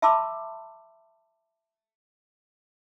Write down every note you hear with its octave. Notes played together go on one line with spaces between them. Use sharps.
E5 A5 B5 C6 D6 E6